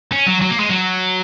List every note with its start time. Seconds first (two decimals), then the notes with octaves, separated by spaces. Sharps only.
0.12 C#4
0.26 F#3
0.42 F#3
0.50 A#3
0.60 G#3
0.69 F#3